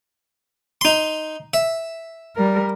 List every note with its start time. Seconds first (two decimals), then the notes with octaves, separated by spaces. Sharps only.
0.81 D#4 C6
1.54 E5
2.36 G3 A#4